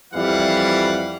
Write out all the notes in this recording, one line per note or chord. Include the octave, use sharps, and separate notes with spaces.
F2 E3 G3 E4 F5 F#5